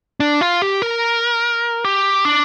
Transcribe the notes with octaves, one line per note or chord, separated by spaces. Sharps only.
D4
F4
G4
A#4
G4
D4